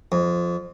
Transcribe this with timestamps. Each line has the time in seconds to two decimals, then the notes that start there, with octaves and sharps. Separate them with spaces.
0.12 F2